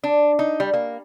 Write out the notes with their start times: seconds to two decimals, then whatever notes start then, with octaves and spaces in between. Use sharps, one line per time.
0.04 D4
0.39 D#4
0.60 G3
0.74 A#3